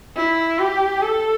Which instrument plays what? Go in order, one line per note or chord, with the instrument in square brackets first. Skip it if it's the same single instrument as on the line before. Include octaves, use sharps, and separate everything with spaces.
[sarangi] E4
G4
A4